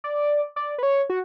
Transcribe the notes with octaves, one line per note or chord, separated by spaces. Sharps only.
D5
D5
B4
C#5
F#4